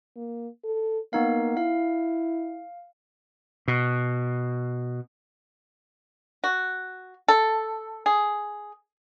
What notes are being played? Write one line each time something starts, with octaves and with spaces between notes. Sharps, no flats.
A#3
A4
A#3 B3 D#4 F5
E4 F5
B2
F#4
A4
G#4